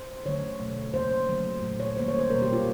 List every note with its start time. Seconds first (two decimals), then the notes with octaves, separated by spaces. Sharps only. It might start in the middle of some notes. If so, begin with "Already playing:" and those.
Already playing: C5
0.25 D3 F#3 A3 C#5
0.60 B2 F#3 A3
0.93 C#3 F#3 A#3 C5
1.28 D3 F#3 A3
1.62 A#2 F#3 A3
1.80 C#5
1.97 D#3 G3 A#3 C5
2.08 C#5
2.19 C5
2.30 B2 G3 A#3 A#4
2.42 G4
2.53 F4